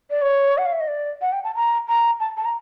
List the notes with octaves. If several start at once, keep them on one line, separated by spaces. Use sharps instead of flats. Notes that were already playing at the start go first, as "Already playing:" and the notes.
D5
C#5
F#5
F5
E5
D#5
D5
F#5
G5
A5
A#5
A#5
A5
A5
A#5